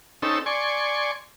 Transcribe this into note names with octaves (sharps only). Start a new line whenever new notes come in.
C4 C#4 D#4 A4 E6
D5 G#5 C6 C#6